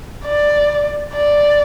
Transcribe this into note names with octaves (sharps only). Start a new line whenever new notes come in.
D5
D5